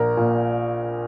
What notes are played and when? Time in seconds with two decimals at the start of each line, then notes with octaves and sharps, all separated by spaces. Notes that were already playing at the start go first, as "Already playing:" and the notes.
Already playing: A#1 A#4
0.17 A#2